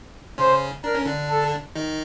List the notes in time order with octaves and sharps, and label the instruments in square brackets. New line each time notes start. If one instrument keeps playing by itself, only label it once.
[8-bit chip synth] C#3 C#4 [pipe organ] C5
[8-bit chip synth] D4 [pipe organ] A#4
[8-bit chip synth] C#4
D3 D4
[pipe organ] A4
[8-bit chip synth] D#3 D#4